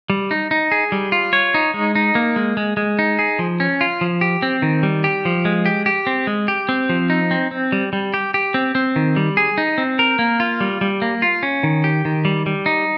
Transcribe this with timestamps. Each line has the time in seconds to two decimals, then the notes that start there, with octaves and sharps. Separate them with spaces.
0.10 G3
0.31 D#4
0.51 D#4
0.72 G#4
0.92 G3
1.12 F4
1.33 C#5
1.54 D#4
1.74 G#3
1.95 D#4
2.15 A#3
2.36 G#3
2.57 G#3
2.77 G#3
2.99 D#4
3.19 G#4
3.39 F3
3.60 C#4
3.81 F4
4.01 F3
4.21 G4
4.42 C4
4.62 D#3
4.83 G3
5.04 G4
5.25 F3
5.45 G#3
5.66 G4
5.86 G4
6.07 C4
6.27 G#3
6.48 G4
6.69 C4
6.89 F3
7.10 D#4
7.31 C4
7.51 C4
7.72 G3
7.93 G3
8.14 G4
8.34 G4
8.54 C4
8.75 C4
8.96 D#3
9.16 G3
9.37 G#4
9.58 D#4
9.78 C4
9.99 A#4
10.19 A#3
10.40 F4
10.61 G3
10.81 G3
11.02 A#3
11.22 F4
11.43 C#4
11.63 D#3
11.84 G4
12.05 D#3
12.25 G3
12.46 G3
12.66 D#4